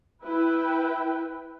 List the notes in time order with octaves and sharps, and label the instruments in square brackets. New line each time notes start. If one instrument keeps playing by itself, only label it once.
[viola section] E4 B4 G5